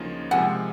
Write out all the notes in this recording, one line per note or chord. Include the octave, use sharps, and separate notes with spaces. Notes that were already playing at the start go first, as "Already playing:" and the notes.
Already playing: D2 C#3 F3 A#3 D#4
C3 F3 G#3 F#5 G#5